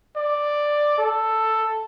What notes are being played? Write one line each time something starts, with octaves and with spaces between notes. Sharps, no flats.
D5
A4